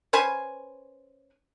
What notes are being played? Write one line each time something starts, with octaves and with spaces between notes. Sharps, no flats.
C#4 B4 C5 G#5